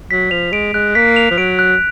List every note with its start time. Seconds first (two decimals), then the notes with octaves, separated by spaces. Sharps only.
0.10 F#3 B6
0.31 F3 F7
0.52 G#3 D7
0.74 G#3 F#6
0.95 A#3 B6
1.16 F7
1.31 F3
1.38 F#3 D7
1.59 F#6